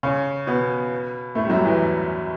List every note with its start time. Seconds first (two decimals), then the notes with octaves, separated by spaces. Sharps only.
0.03 C#3 C#4
0.47 B2 B3
1.35 A2 A3
1.45 G3
1.50 F#2 F#3
1.65 E2 E3